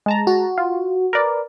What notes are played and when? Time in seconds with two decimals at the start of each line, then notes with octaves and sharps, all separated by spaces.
0.06 G#3 A5 A#5
0.27 F#4
0.58 F4
1.13 A#4 B4 D5